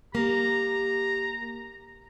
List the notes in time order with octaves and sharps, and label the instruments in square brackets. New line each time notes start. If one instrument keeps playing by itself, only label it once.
[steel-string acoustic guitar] A#3 [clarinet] G4 [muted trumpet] A#5